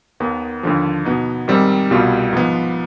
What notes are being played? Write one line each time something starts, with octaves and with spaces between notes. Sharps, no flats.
D#2 D#3 B3
D#2 D3 F3
B2 B3 D#4
G#2 D#3 G3 C4
C2 B2 G3 B3 F4
G#2 F3 B3